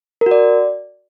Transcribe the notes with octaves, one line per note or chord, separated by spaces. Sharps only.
A#4
F#4
D5